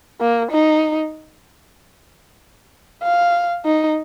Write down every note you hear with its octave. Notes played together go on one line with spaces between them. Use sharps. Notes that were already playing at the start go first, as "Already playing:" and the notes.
A#3
D#4
F5
D#4